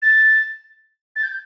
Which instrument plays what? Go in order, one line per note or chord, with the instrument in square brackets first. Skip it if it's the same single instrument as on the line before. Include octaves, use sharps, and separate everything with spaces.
[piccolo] A6
A6
G6